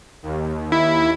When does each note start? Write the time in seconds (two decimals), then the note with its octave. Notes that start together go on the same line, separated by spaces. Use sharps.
0.23 D#2
0.72 E4